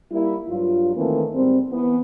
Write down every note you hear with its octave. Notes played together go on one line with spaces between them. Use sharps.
G3 A#3 E4
G2 F#3 F4
D#3 E3 A3 A#3 C4
G#2 G3 C4
E3 B3